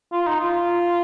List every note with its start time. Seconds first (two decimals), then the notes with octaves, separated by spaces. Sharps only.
0.12 F4
0.27 D#4
0.40 F4